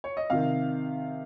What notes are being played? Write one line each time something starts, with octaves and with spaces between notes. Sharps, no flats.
C#5
D#5
C3 D#3 F5